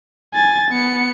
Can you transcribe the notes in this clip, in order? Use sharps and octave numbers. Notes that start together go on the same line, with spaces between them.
G#5 A6
B3 C#7